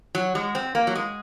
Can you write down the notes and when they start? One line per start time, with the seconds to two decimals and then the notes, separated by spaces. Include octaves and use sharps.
0.15 F#3
0.35 G#3
0.55 C4
0.75 A#3
0.87 F#3
0.95 G#3